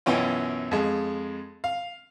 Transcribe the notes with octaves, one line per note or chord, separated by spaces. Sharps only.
F#2 B2 E3 C#4 F4 G5
F2 G#3
F5